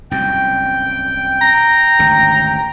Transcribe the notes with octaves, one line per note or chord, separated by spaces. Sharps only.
C2 F#2 G5
A#5
G#1 D2 C#3